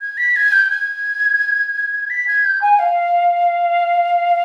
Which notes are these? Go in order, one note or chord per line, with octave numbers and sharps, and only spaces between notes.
G#6
B6
G#6
G6
G#6
B6
G#6
G6
G#5
F5